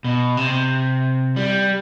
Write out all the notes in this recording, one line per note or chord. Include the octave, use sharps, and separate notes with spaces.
B2
C3
G3